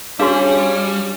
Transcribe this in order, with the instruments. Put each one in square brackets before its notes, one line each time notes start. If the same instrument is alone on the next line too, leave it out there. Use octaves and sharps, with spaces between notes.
[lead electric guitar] G3 [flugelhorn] C#4 [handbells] D4 [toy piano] F#4 G#4 F5